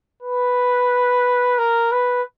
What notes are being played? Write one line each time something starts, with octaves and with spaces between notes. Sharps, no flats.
B4
A#4
B4